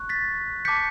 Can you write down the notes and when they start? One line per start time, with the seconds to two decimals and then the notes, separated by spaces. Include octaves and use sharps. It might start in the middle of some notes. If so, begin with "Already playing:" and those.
Already playing: C#6 F#6
0.09 A6 B6
0.65 A5 D6 G6 B6 C#7